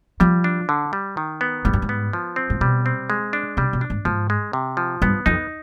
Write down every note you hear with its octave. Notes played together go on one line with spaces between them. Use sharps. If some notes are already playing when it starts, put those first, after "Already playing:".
F3 G3
D4
D3
G3
D#3
B3
G#2 G3
G2
G#2
B3
F3
C4
G#2
B2 G3
C4
G#3
D4
C3 G3
B2
D4
G#2
G#2 F3
G#3
C3
F3
G2 B3
F2 D#4